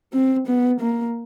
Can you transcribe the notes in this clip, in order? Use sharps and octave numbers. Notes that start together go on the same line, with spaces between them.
C4
B3
A#3